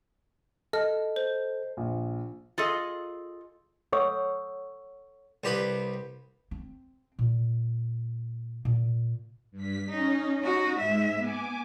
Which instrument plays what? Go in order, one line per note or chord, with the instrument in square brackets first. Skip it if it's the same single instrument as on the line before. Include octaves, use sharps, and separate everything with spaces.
[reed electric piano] A4 [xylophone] D#5 F6
[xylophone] C5
[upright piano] A#1
[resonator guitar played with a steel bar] F4 G#4 A4 D#5
[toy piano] A4 C#5 F#5 C#6 E6
[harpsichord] C2 G4 B4
[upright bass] C4
A#2
A#2
[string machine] G2 B6
[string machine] C#4 [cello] D#4
[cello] D#4 F#4
[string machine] G#2 [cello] G#3 E5
[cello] B3 [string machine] G#5 D6